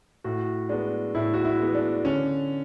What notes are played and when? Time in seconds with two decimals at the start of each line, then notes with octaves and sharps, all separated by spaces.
0.24 A2 F#4
0.69 G#3 B3 D4
1.15 A2 E4
1.34 F#4
1.44 E4
1.60 G#3 B3
1.75 D4
2.05 D3 C#4